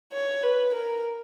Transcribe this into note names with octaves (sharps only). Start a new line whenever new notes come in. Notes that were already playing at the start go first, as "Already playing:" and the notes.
C#5
B4
A#4